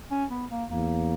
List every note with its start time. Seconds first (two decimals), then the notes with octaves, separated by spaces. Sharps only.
0.11 C#4
0.31 B3
0.51 A#3
0.71 E2 A#3